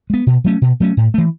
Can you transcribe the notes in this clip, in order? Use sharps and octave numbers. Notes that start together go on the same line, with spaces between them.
G#3 B3
B2
F#3 A3 C#4
B2
F#3 A3 C#4
A2
E3 A3